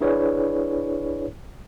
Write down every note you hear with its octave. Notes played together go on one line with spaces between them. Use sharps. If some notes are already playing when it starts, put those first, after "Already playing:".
D4 E4 G#4 B4 C#5 D5